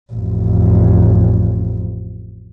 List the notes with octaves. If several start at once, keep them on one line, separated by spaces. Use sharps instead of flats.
A1 F2